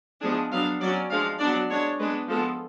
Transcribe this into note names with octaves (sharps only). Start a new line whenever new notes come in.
F3 G#3 B3 D4 G#4
F#3 B3 D4 F5
F#3 C#4 D5
F3 G#3 D4 F5
F#3 B3 D4 D5
G#3 D4 C#5
G#3 B3 D4 B4
F3 G#3 B3 A4